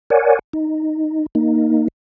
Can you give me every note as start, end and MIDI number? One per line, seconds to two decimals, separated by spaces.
0.10 0.39 70
0.10 0.39 73
0.10 0.39 74
0.10 0.39 78
0.10 0.39 80
0.53 1.26 63
1.35 1.88 58
1.35 1.88 63